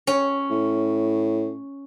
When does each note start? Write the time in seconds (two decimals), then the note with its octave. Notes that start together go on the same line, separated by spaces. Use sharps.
0.07 C#4
0.50 A2